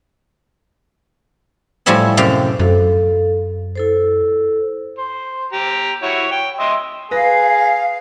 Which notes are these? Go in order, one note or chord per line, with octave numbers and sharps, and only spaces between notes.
A2 F3 G3 C#5 E5 G#5
F#2 C3 G4 F5
F#2 A4 F5
E4 A4 C5
C5
G4 A#5
E4 F#4 C#5
G5
D#5 E5 C6
G#4 B4 F5 A#6